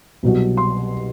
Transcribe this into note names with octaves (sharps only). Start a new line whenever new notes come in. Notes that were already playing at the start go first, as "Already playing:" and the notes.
C2 B2 F#3
C6